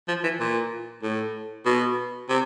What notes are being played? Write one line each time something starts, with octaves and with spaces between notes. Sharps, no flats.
F3
E3
A#2
A2
B2
C3